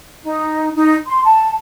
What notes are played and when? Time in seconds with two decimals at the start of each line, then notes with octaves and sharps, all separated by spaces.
0.24 D#4
0.76 D#4
1.07 C6
1.24 A5